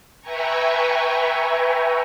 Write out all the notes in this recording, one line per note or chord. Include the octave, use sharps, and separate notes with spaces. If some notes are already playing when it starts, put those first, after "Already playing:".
B4 E5 G5 G#5 A#5 C#6